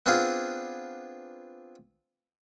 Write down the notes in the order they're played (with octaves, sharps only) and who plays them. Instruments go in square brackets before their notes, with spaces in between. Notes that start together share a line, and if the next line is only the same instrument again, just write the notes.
[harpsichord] B3 C4 D4 F4 G#4